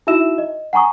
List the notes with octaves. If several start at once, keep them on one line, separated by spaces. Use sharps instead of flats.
D#4 E4 F#4 E5 E6 E7
D#5
F#5 G#5 A#5 C#6 D#6